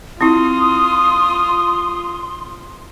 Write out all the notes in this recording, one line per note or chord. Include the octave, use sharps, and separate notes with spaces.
C4 E4 F4 C6 D#6